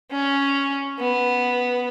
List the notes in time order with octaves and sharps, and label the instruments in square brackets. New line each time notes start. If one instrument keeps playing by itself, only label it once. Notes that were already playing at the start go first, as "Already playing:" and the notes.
[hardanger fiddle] C#4
B3